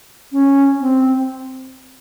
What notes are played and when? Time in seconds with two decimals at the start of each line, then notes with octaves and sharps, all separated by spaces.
0.32 C#4
0.80 C4